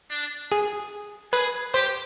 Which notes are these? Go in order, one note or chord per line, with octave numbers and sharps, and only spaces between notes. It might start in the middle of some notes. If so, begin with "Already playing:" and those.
D4
G#4
G#4 B4
G4 C5